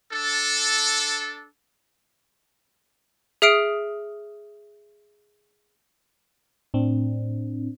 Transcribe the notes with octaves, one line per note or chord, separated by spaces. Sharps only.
D4 A4
G#4 E5 D#6 F6 C7 D7
A2 C4 D4